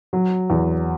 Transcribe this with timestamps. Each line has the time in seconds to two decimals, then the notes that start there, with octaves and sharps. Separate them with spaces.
0.13 F#3
0.50 E2